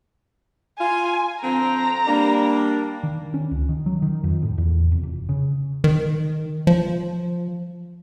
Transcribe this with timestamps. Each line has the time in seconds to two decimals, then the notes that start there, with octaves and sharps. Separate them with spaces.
0.79 F4 G#5
1.42 D3 F3 C4 A#5
2.07 G3 A#3 D4
3.03 D#3
3.34 C#4
3.51 C#2
3.69 D#3
3.86 F#3
4.02 D#3
4.24 F2
4.42 A2
4.58 E2
4.92 F1
5.03 F1
5.29 C#3
5.84 D#3
6.67 F3